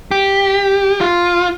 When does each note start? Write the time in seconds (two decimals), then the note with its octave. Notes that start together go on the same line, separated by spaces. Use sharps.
0.11 G4
1.01 F4